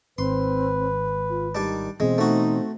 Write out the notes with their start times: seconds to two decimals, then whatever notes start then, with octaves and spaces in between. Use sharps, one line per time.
0.18 G#1 C4 B4 C6
1.30 F4
1.55 D#3 G3 D4
2.00 B2 E3 G#3 C4
2.18 A3 D#4 F#4